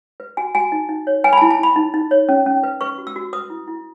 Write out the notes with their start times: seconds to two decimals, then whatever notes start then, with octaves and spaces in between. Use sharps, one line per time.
0.20 B4
0.37 F#4 G#5
0.55 F#4 G#5
0.72 D#4
0.89 D#4
1.07 C#5
1.24 B4 G#5
1.33 B5
1.37 A5
1.42 E4
1.51 A5
1.59 E4 B5
1.76 D#4
1.94 D#4
2.11 C#5
2.29 C#4
2.46 C#4
2.63 B4
2.81 B4 C#6
2.98 F#4
3.07 E6
3.16 F#4
3.33 B4 D#6
3.50 E4
3.68 E4